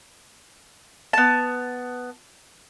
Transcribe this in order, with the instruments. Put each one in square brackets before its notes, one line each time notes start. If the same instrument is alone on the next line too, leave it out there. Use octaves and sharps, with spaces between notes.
[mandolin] B3 A5